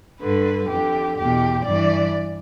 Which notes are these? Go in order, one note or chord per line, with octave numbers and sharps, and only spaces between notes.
G2 D3 B4
F2 D3 G4
E2 B2 G4
G2 E3 D5